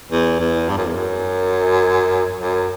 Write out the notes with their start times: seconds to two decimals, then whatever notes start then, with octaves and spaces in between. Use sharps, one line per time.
0.11 E2
0.40 E2
0.69 G2
0.77 F#2
0.86 E2
0.95 F#2
2.40 F#2